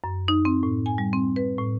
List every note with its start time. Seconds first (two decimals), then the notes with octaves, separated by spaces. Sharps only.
0.04 F#2
0.28 D#4
0.45 C4
0.63 A2
0.86 G#5
0.98 G3
1.13 C4
1.36 B4
1.58 A2